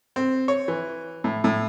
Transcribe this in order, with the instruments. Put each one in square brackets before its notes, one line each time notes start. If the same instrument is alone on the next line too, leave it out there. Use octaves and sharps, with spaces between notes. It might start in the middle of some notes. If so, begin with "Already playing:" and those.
[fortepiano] C4
C#5
E3
A2
A2